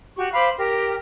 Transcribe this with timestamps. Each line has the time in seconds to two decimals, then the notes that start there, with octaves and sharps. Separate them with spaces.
0.16 F#4 G4 C#6
0.33 C5 F5 B5 D6
0.57 G4 A#4